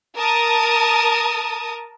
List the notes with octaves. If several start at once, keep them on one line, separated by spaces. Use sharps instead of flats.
A#4 A5 D#6